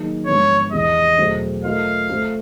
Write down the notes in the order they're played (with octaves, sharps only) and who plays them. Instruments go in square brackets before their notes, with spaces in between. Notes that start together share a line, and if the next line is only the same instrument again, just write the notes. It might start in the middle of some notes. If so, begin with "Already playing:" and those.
Already playing: [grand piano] D#3 F#3 A#3 D#4 G#4
[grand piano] G#2 F3 G#3 B3 D4 [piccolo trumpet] C#5
[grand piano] E2 C3 E3 [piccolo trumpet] D#5
[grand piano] E2 B2 F#3 A3 C4
[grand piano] A3 C4 F4 A#4 D#5 [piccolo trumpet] F5
[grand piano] A3 C4 F4 A4 C5